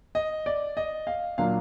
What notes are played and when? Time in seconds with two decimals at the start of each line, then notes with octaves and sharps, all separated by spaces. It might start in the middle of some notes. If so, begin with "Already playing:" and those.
0.15 D#5
0.46 D5
0.77 D#5
1.07 F5
1.38 A#2 F#3 A#3 D4 F5